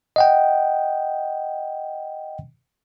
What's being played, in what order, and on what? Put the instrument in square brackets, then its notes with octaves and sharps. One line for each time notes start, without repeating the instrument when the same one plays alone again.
[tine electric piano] D#5 F#5 G5